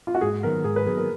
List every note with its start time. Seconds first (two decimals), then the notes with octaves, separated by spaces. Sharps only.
0.07 F4
0.15 F#4
0.21 G#2 G#4
0.43 D#3 F#3 B3 A#4
0.64 G#2 G#4
0.76 B4
0.86 D#3 F#3 B3 G#4
0.97 A#4